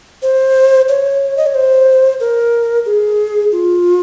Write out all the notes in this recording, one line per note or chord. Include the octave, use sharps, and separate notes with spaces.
C5
C#5
D#5
C#5
C5
A#4
G#4
F4